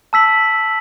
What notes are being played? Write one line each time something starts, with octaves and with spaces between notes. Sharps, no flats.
A5 E6 B6 F#7